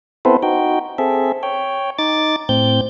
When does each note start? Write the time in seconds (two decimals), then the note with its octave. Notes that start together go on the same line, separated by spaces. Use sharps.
0.25 B3 C4 E4 A4 B4 C5
0.43 D#4 F#4 G5
0.98 C4 G#4 A4 E5
1.43 C#5 G5
1.98 D#4 D6 A6
2.49 A2 C4 G6